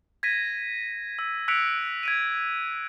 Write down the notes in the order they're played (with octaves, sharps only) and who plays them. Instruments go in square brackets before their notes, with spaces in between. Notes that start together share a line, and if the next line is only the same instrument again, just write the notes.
[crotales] G#6 A#6 B6 D#7
E6
E6 F#6 B6 C#7 D7 F7
G#6 D7 D#7